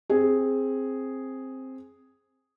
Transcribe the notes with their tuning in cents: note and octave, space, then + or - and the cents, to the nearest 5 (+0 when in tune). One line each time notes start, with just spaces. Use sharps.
C4 +10 G#4 +0